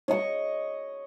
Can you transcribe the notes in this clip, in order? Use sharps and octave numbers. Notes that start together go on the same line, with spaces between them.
C#5 D#5 C#6